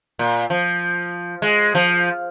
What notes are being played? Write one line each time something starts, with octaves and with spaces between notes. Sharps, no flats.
A#2
F3
G#3
F3